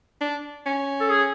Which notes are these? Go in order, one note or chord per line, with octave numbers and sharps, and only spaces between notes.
D4
C#4
A4
G#4